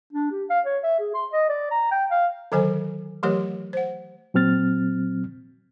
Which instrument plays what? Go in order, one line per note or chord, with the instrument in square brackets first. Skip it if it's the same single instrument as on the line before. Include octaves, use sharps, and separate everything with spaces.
[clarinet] D4
G4
F5
C#5
E5
G#4
C6
D#5
D5
A#5
G5
F5
[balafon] D3 D#3 F#3 A4 C5 G#5
E3 F#3 A3 G4 A#4 C#5
C5 F#5
[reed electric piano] A#2 F#3 C4 F6 A6